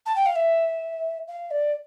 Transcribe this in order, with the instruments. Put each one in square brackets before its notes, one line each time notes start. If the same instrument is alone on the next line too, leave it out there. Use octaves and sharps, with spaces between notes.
[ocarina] A5
G5
F5
E5
F5
D5